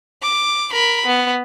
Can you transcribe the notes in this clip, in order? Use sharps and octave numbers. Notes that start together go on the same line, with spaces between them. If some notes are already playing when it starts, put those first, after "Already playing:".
D6
A#4 B5
B3